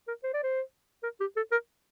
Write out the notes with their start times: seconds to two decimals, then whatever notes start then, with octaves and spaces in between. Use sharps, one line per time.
0.08 A#4
0.24 C5
0.34 D5
0.43 C5
1.03 A#4
1.20 G4
1.36 A4
1.52 A#4